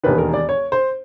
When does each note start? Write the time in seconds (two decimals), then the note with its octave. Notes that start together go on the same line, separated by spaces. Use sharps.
0.04 E1 D#2 D#3 B4
0.18 A#4
0.34 D5
0.49 C#5
0.72 C5